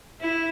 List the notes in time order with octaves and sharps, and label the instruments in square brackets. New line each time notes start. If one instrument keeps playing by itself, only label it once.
[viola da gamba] E4